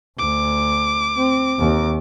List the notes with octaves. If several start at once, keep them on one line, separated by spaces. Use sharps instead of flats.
D2 D6
C4
D#2